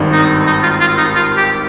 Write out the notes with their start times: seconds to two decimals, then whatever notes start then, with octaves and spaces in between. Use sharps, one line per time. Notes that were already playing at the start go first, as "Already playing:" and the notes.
Already playing: G#1 G2 D#3
0.12 D#4
0.46 D#4
0.63 F4
0.81 F4
0.98 D#4
1.15 F4
1.37 G4